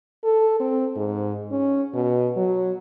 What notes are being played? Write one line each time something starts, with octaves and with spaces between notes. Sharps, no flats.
A4
C4
G#2
C#4
B2
F#3